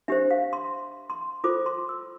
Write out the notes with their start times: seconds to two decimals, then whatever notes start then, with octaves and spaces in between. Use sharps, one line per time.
0.08 D4 G4 C5 E5
0.31 F5
0.53 C6
1.10 C6
1.44 F4 A4 C5 D6
1.66 C6
1.89 E6